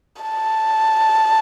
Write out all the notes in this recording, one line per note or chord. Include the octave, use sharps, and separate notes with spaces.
A5